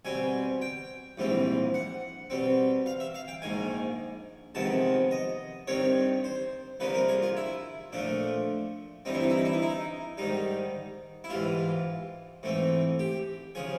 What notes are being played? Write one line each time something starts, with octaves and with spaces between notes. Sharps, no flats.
B2 G3 C4 G#5
G5
A#1 G#2 E3 G3 C4
F#5
B2 G3 C4
F5
E5
F5
G5
A#1 G#2 D#3 G#5
F2 C3 D#3 G#3 B3 A5
D#5
G2 D#3 G3 C4 C#5
C5
C2 C3 F3 A#3 D4 B4
A#4
G#4
F4
E4
A#2 F3 A3 D4
G2 E3 G3 C4 D#4
E4
D#4
E4
D#4
E4
D#4
E4
D#4
G#2 D#3 G3 D#4
E4
G#2 E3 G3 F4
G#2 E3 A3 C4
G4
C#3 F3 G#4